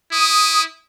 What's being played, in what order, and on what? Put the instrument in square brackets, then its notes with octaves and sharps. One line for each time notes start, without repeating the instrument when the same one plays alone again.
[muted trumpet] E4 [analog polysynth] D#6